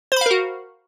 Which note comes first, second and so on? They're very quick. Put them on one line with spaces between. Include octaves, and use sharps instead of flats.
C5 B5 F5 A#4 F#4